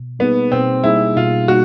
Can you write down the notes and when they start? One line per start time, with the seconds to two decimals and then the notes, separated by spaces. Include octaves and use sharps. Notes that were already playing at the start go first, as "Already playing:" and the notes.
Already playing: B2
0.19 G3 A#3 B3 D#4 G#4
0.52 B2 C4
0.84 G3 A#3 D#4 E4 G#4
1.17 B2 F4
1.48 G3 A#3 D#4 F#4